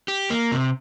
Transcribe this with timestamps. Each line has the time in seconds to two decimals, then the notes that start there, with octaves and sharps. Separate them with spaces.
0.08 G4
0.30 A#3
0.52 C3